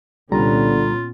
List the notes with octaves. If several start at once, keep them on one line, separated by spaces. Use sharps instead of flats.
C2 A#2 D3 G3 B3 C#4 F4 A#5